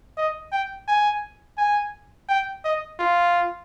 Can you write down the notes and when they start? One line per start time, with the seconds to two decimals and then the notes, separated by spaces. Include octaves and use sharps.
0.17 D#5
0.52 G5
0.88 G#5
1.58 G#5
2.29 G5
2.64 D#5
2.99 F4